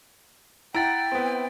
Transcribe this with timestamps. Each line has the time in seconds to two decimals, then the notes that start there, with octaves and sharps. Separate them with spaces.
0.74 E4 F#5 G5 A#5 A6 D7
1.12 B3 C4